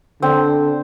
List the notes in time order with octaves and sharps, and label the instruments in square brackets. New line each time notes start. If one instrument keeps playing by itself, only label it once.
[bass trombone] D3 [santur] C4